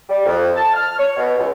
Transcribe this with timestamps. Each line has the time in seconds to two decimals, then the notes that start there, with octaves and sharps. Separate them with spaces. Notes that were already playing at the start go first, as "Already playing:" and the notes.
0.09 G3
0.26 F2
0.56 A5
0.74 F6
0.98 C#5
1.17 B2
1.38 C#2